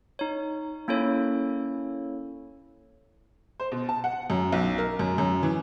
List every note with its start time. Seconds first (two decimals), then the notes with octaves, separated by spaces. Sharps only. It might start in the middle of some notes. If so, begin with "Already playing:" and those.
0.19 D#4 C#5
0.88 A#3 C#4 E4 A4 C#5
3.60 C5
3.72 B2
3.89 A5
4.04 F#5
4.30 F#2
4.52 B1
4.78 A#4
4.99 F#2
5.18 F#2
5.43 E3